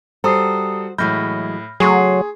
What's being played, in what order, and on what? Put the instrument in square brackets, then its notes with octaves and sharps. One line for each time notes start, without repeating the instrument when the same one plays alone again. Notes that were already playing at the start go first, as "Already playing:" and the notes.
[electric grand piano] G3 A4 [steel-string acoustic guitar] F#4 C5 [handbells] A#5 D#6 C7
[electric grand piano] A2 G6 [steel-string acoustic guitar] E3 F#3 G#3 [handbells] B5 F6 A#6
[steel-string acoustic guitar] C#3 A3 [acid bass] F#3 [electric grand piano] G#4 [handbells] C6 C#6 C7